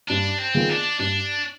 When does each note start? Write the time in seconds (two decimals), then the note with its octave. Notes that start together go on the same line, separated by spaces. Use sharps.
0.09 G2 D4
0.39 C4
0.54 D#3 B3 F4 G#4
0.70 D4
0.99 G2 D4